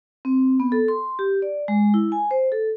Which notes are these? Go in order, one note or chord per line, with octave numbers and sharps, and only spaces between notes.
C4
B3
A4
C6
G4
D5
G#3
E4
G#5
C5
A4